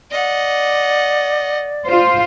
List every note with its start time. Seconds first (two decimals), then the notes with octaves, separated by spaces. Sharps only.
0.11 D5 D#5 F#5
1.86 F4 C5